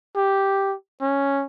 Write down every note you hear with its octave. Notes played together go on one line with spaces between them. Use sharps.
G4
C#4